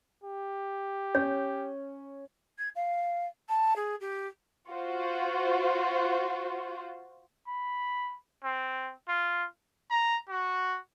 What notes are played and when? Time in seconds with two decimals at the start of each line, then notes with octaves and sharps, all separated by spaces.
0.24 G4
1.15 C#4 C#5
2.58 G#6
2.76 F5
3.49 A5
3.76 G#4
4.01 G4
4.69 F4 F#4 C5
7.47 B5
8.44 C4
9.08 F4
9.91 A#5
10.29 F#4